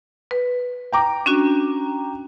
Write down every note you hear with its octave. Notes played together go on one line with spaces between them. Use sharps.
B4
G5 A#5 D6
C#4 D4 F#4